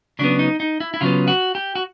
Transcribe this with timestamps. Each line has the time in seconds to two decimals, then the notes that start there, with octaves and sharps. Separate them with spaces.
0.19 C#3 F#3 B3 D4
0.39 D#4
0.60 D#4
0.80 E4
0.94 E4
1.01 C#3 F#3 B3 F4
1.28 F#4
1.55 G4
1.75 F#4